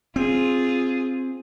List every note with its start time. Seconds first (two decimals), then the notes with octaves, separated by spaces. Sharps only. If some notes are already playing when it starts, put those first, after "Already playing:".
0.16 C4 F4 G#4